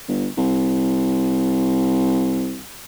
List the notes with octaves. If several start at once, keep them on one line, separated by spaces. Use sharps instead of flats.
G1
C2